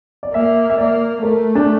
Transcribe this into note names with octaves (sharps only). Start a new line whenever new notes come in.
D5
A#3 E5
E5
A#3 D5
A3 A#4
D4